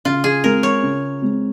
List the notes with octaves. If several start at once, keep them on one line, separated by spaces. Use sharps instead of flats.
C#3 F4
G#4
G#3 C4 A#4
C#5
C#3
G#3 C4